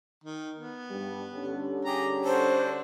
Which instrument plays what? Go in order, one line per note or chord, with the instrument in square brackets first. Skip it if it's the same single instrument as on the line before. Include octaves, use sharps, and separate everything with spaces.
[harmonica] D#3
B3
[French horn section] G2 G3
D3 G3 C#4
[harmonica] G4 G#4 A#5
[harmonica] D4 F#4 A4 [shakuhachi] C5